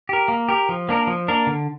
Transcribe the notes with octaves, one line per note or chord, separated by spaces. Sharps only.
G4 A#4
A#3
G4 A#4
F3
A#3 D4 A#4
F3
A#3 D4 A#4
D3